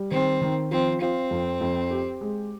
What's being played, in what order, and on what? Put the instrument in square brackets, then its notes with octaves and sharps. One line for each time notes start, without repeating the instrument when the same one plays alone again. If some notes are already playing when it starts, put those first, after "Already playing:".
Already playing: [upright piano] G3
[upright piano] D#3 [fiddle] C4
[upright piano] D#3
[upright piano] F3 [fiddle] C4
[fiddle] C4 [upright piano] F4
[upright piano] F2
F2
G4
G#3